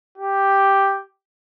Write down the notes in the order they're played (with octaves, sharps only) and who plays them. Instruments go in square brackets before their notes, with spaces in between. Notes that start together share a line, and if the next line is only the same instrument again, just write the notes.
[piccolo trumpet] G4